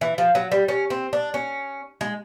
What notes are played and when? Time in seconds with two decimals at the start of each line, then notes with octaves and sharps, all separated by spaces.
0.01 E3
0.18 F3
0.35 F#3
0.52 G3
0.68 C#4
0.90 C4
1.13 D4
1.34 C#4
2.01 G#3